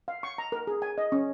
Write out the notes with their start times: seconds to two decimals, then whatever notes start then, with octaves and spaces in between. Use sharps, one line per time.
0.08 F5
0.23 C#6
0.38 A#5
0.52 A#4
0.67 G#4
0.82 G#5
0.98 D#5
1.12 C#4